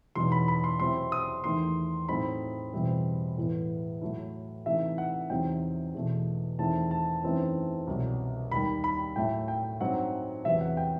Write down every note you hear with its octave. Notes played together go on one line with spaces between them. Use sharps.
E2 B2 F#3 B3 D#4 C6
B5
B5
C6
C3 F#3 C4 E4 C6
D#6
E2 D#3 A3 C6
A2 F#3 A3 C4 D#4 B5
E2 B2 G3 C4 E4
A2 E3 B3
A2 F#3 A3 E4
C3 E3 A3 D#4 E5
F#5
E2 C3 F#3 C4 D#4 G5
E2 B2 A3
E2 D#3 A3 C4 E4 A5
A5
F#2 E3 A3 C4 D#4
C2 B2 F#3
D#2 D#3 G3 B5
B5
A2 F#3 A3 E4 G5
G5
G2 F#3 C4 D#4 F#5
E2 C3 F#3 B3 E5
F#5
G5